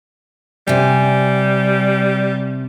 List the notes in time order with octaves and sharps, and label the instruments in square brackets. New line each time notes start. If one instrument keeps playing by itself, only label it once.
[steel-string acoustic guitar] C3 G#5 [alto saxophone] G3